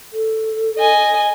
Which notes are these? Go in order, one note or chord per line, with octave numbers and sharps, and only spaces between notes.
A4
D#5 G#5